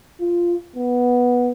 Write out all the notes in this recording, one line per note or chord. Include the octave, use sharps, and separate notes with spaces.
F4
B3